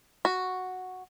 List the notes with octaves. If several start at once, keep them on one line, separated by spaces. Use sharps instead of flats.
F#4